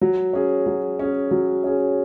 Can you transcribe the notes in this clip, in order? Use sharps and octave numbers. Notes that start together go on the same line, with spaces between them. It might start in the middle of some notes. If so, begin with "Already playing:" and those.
F#3
C#4 G#4
F#3
C#4 G#4
F#3
C#4 G#4